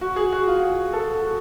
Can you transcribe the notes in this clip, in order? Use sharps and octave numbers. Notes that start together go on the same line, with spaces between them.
F#4
G#4
F#4
F4
G#4
A4
F#4